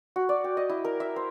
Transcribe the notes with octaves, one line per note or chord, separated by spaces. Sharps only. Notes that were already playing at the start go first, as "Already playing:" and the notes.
F#4
D5
G5
D#5
E4
A#4
E5
C5